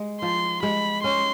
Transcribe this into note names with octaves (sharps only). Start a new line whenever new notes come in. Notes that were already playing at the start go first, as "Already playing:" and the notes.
Already playing: G#3
F3 C6
G#3 B5
C#4 C6